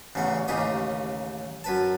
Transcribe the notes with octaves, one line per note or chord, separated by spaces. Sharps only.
A1 E2 C#3 F#5
A1 D#2 C#3 G4 A#4 D#5
F#2 B4 A5